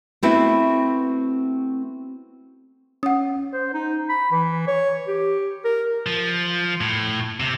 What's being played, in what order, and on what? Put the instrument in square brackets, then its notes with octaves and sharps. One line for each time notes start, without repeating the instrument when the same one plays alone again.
[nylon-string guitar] A3 B3 C4 E4 F#4 B4
[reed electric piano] C#4 [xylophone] F#5 D#6
[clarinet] C5
D#4
B5
E3
C#5
G4
A#4
[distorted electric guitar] F3
A2
C3